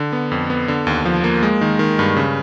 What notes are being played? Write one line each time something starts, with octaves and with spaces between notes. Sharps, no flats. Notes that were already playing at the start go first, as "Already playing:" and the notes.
Already playing: D3
B3
F2
B3
D3
D#2
F3
A#3
G#3
D#3
D#3
G2
C#3